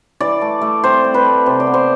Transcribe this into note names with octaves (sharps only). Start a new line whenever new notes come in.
E3 D5
A3
A3
C4 C5
C4
B4
A3
C3 C5
D5
B3
C5